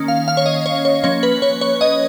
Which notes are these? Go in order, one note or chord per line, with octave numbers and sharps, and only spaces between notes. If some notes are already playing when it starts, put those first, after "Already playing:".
Already playing: D#3 A#3 C#4
F5
F5
C#5
D#5
C#5
C#5
F3 A#3 C#4 C#5
B4
C#5
C#5
D#5